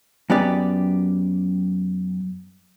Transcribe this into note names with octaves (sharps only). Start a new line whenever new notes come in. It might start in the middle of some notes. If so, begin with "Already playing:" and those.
F#2 B3 G4 D5